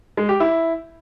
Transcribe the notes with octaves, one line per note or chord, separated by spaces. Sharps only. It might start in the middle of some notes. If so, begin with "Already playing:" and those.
G#3
G4
E4